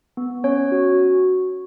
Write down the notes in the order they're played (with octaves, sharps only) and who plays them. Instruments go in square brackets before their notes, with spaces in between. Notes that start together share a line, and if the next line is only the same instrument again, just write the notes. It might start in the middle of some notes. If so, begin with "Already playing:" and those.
[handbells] B3
C#4 C#5
F#4